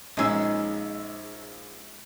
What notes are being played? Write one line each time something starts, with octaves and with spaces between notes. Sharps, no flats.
A#1 G#3 C#4 D#4 E6